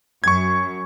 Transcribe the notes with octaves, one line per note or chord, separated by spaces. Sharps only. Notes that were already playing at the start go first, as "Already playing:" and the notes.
F#2 C#6 G#6